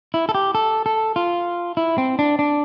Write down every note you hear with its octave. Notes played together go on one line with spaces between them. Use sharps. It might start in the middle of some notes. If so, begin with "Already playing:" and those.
E4
A4
G4
A4
A4
F4
E4
C4
D4
D4